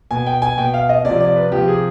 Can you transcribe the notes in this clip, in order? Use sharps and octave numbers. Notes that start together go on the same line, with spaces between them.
B2 G#5
G5
G#5
B2 G5
F5
D#5
C3 F3 D5
D5
B4
C3 F3 G4
G#4